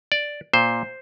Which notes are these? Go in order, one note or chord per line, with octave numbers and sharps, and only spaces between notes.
D5
A#2 C5